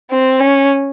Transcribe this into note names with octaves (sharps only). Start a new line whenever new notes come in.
C4
C#4